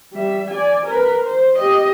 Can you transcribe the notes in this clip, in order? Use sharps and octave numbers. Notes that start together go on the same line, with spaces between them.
G3 E5
D5 G#5
A#4 B4
C5
G4 D#5